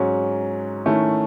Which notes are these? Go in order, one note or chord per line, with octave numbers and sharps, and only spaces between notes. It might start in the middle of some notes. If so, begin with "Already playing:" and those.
Already playing: G#2 F#3 C#4
D#3 A3 C#4 E4